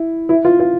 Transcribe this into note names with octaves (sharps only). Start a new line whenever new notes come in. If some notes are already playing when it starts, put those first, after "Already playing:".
Already playing: E4
E4
F4
F4